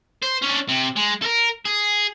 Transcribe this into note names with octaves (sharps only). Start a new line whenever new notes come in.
C5
C#4 D4
C3
G#3
A4 A#4
G#4